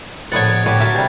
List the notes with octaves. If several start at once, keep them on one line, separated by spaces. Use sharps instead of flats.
A#1 A2 D3 B3 F#5 C#6 G#6 A6
A2 D3 F#4 G4 B4
F#3 A4 A#4 E5
C3 G3